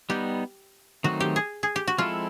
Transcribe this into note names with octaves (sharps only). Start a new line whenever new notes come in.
G3 B3 D#4 G4
D#3 F#3 A3 C4 D#4 F#4
G4
G#4
G#4
G4
F#4
F3 G#3 C4 E4 F4 A4